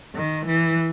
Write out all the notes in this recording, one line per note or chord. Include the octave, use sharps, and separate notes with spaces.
D#3
E3